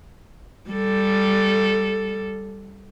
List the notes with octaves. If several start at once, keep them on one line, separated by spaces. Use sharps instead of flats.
G3 A4